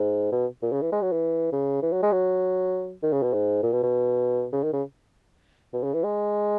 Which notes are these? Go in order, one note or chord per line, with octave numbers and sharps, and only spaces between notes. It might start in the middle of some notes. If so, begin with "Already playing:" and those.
Already playing: G#2
B2
A#2
C#3
E3
G#3
F#3
E3
C#3
E3
F#3
G#3
F#3
D#3
C#3
B2
G#2
A#2
B2
B2
C#3
D#3
C#3
B2
C#3
E3
G#3